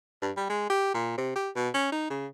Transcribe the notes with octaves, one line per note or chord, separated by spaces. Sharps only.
G2
G3
G#3
G4
A#2
C3
G4
B2
C#4
D#4
C#3